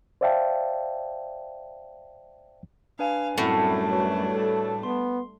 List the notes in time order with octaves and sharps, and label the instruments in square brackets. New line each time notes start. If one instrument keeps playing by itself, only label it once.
[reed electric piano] C5 D5 E5 F5 G5 A5
[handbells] D4 B4 G#5 [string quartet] F5
[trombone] F#2 [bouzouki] A2 [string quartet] G3 A3 D4 [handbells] C4 F#5 C#6
[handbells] F#4 B4 C#5
[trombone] A4
[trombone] B3 [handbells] C6